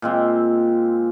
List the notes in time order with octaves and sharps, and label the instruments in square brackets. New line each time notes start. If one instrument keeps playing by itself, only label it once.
[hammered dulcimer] A#2 G#3 C4